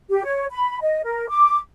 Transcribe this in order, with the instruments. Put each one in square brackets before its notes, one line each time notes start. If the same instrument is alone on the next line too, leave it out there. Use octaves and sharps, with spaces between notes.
[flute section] G4
C#5
B5
D#5
A#4
D6